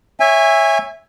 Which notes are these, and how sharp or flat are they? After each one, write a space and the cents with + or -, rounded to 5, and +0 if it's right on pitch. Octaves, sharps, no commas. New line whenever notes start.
C#5 +0 E5 +0 G#5 -25